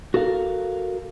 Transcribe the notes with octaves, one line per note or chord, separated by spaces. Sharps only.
F#4 A4 A#4 F5